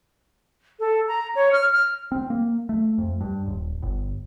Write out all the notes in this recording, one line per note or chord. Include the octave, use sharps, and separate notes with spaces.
A4
A#5
C#5
F6
F6
C4
A#3
A3
F2
G2
D#1
G1